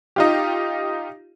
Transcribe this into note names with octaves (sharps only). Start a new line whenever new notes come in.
D#4 F4 G4